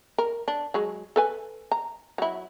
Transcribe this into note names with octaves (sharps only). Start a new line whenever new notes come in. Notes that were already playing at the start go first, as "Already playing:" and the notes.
A#4
D4
F#3 G#3
A4 B4 G#5
A#5
F#3 E4